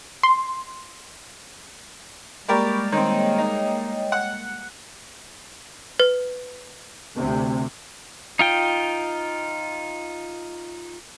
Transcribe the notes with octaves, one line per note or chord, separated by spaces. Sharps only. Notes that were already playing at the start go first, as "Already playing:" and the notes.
C6
G3 G#3 A#3 G4 A#4 D5 B5 C#6
D#3 C4 C#5 D#5 G5
D#4
F#5
B4
D2 C3
D#4 F4 G5